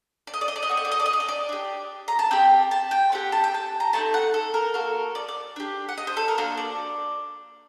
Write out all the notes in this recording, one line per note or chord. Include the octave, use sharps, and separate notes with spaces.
D5
D#5
D5
D#5
D5
D#5
C4 F#4 A4 D5
D#5
D5
D#5
D5
D#5
D5
D#5
D5
D4 G4
A#5
A5
C4 G4 G5
A5
G5
C4 G4 F#5
A5
G5
A5
A#5
A3 C4 D#4 A5
F#5
A4
A#4
A#3 F#4 A4 A#4
D5
D5
D4 G4
F#5
D#5
C5
A4
A#4
A#3 D4 F#4 A4 C5
D5